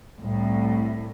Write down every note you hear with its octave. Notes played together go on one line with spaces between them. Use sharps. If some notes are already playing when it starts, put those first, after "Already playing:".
C2 A2